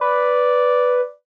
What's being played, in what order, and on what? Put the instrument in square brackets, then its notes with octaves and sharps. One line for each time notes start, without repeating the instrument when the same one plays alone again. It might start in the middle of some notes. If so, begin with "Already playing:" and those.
[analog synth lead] B4 [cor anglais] D5